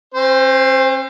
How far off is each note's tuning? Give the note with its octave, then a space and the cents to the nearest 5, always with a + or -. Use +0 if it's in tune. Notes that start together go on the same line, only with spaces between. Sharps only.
C4 +45 C5 -5